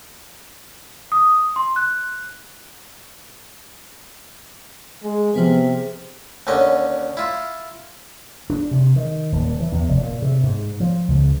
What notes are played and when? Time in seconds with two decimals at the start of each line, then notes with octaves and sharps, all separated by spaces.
1.12 D#6
1.56 C6
1.76 F#6
5.03 G#3
5.34 C3 F3 B3 G#4
6.47 D#2 D3 C#4 D#5
7.17 E4 F4
8.50 D4
8.71 C3
8.96 D#3
9.32 D#1
9.60 E3
9.72 E2
9.88 F1
10.01 A#2
10.22 C3
10.43 G#2
10.80 F3
11.08 C#2